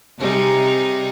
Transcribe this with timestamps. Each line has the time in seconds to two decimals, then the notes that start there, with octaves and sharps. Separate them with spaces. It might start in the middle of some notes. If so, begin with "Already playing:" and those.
0.19 C3 G3 D#4 G#4